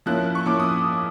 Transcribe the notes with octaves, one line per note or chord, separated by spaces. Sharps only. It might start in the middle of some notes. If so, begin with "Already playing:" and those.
F3 A#3 C#4 E4 F#6
C#6
F3 A#3 C#4 E4 D6
D#6